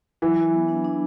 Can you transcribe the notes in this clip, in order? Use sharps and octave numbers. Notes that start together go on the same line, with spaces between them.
E3 F#3
F#3
B3
D4
D4